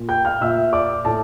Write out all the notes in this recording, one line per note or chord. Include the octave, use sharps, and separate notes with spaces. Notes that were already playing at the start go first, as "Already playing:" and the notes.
Already playing: A#2
G5 G6
F5 F6
A#2 E5 E6
D5 D6
A2 A4 A5